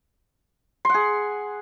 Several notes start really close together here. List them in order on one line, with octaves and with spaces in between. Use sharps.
C6 F#5 G#4